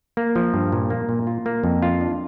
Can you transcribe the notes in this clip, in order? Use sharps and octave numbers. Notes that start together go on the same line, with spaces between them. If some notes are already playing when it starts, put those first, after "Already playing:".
A#3
F3
G2
A#2
A#3
A#2
F4
A#3
F2
F4
D4